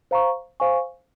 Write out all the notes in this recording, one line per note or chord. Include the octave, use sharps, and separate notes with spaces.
C5 F5 A#5 C#6
C5 F5 G#5 C#6